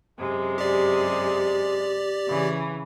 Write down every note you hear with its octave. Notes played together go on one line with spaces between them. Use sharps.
F#2 C3 G#3
G4 D5
C#3 E3